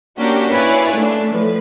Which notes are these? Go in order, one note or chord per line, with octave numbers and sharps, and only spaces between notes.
A#3 C#4 D4 F#4 G4
E4 B4 C#5 D5 F5 G#5
A3 D4
A2 F3 B4